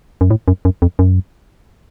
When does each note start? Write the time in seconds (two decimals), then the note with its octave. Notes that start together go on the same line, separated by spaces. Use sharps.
0.21 F#2
0.31 A2
0.48 F#2
0.65 F#2
0.82 F2
0.99 F#2